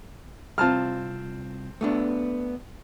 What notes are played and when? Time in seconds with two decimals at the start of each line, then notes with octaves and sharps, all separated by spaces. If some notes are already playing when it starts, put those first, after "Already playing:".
0.58 C2 C4 F4 A5 F6
1.81 A3 B3 D4